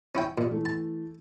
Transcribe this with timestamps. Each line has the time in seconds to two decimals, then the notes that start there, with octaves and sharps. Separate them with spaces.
0.15 C#4 E4 G5
0.38 A#2 G4
0.51 E3 A3 E4
0.65 A5